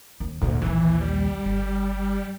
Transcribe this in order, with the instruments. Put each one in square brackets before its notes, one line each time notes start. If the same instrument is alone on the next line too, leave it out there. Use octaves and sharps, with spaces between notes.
[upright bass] D#2
[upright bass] A1 A#2 [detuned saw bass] D2
[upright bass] A#1 D#2 [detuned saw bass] E3
[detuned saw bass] G3
[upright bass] G1